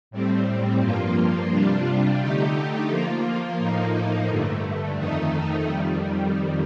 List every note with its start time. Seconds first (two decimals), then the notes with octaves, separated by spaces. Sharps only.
0.11 A2 G3 C4
0.80 G2 F3 A#3 F4
1.50 C3 G3 D4 F4
2.20 D3 A3 D#4 G4
2.89 F3 A#3 F4
3.58 A2 F3 A#3 D#4
4.28 G2 D3 A3
4.97 F2 D#3 A3 D#4
5.67 F2 D#3 G3